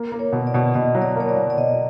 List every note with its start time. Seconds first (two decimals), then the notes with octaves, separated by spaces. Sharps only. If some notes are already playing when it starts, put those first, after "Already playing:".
Already playing: A#3
0.12 A#3
0.19 C#5
0.32 B2
0.47 D5
0.54 B2
0.74 B2 D#5
0.95 F#3
1.02 D5
1.16 A#3 C#5
1.29 D5
1.36 F#3
1.50 D5
1.57 B2 D#5